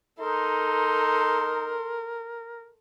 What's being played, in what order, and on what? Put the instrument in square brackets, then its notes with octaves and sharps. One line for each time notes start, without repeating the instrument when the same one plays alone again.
[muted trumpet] D#4 [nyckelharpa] A4 C6 [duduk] A#4